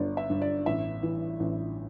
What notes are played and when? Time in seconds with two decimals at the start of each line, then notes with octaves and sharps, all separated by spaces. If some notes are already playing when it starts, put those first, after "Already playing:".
Already playing: G1 G2 D5
0.17 E5
0.30 G2
0.42 D5
0.66 A1 E5
1.03 E3
1.40 A1